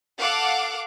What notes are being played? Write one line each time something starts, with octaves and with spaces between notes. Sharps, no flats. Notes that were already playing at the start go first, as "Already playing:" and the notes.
A4 F5 F#5 D6